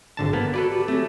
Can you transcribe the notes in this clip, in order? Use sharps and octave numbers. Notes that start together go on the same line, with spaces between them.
G#1 D3 A5
A#3 B3
F#4 A4 B4 D5
G4
A3 C4 C#4